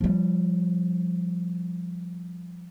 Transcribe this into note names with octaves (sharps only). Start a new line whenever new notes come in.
F3 G3